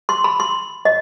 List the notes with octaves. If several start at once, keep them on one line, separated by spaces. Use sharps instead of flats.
C6
B5
C6
D#5